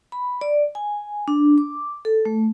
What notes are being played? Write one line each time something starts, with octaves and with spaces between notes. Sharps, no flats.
B5
D5
G#5
D4
D6
A4
A3